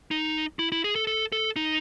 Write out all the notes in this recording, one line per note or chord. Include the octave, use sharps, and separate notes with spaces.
D#4
E4
E4
G#4
A4
A4
A4
D#4